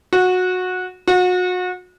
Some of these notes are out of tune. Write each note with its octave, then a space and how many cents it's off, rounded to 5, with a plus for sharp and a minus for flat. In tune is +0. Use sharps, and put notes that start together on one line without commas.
F#4 -20
F#4 -35